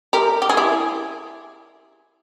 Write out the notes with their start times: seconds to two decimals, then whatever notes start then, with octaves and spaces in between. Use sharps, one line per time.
0.13 G4 A#4
0.42 G4
0.49 G#4
0.57 E4 G4